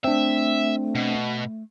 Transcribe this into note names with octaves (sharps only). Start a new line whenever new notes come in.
A3 C4 D4 E5
B2